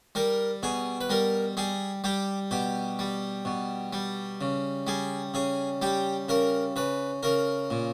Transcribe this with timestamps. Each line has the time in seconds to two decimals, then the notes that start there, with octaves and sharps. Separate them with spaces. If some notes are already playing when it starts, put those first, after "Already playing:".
0.15 G3 A#4
0.63 B2 G#4
1.01 B4
1.09 G3 A#4
1.57 G3 G#4
2.04 G3 G4
2.51 B2 G4
2.99 G3
3.45 B2
3.93 G3
4.41 C#3
4.87 G3 G#4
5.34 C#3 G#4
5.82 G3 G4
6.29 C#3 A#4
6.76 C#3 B4
7.23 C#3 A#4
7.70 A#2